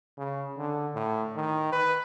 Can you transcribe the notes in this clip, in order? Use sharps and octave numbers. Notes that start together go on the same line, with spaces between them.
C#3
D3
A2
D#3
B4